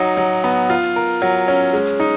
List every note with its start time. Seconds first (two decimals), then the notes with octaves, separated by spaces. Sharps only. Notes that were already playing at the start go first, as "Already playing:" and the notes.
Already playing: F#3 D#4
0.17 F#3
0.44 B3
0.70 F4
0.96 A#4
1.22 F#3
1.48 C#4
1.73 G#3
2.00 D#4